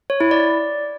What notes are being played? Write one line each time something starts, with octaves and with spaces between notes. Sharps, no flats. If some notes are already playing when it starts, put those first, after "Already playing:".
C#5
E4
D5